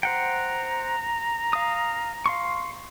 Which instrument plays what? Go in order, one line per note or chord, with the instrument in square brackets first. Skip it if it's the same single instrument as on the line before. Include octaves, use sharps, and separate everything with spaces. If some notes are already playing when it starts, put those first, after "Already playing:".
[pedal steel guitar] C5 F#5 G5 [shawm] A#5
[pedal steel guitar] F5 D#6
F5 C6 C#6